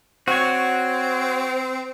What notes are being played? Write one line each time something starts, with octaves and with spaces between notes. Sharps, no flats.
C4 F#4 C#5